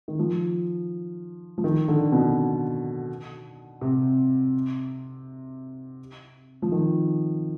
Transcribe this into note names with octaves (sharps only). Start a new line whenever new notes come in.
D#3
F3
F3
D#3
D3
B2
C3
F3
D#3